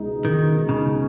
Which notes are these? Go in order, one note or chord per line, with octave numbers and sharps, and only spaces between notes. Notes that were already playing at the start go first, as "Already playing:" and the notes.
Already playing: C#2 B2 G#3 D#4
D#3
C#3